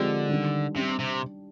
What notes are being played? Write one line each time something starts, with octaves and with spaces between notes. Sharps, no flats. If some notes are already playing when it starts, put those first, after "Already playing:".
Already playing: D3 F3 G#3 C4 G4
D#3 G3 D4
C3 G3 D4 G4
C3